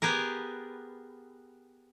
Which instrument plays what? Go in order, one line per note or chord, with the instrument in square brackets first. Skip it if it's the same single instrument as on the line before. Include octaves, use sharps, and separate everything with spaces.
[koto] B3 G4 G#4 A#4